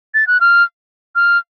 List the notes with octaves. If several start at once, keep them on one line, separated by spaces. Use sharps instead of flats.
A6
F#6
F6
F6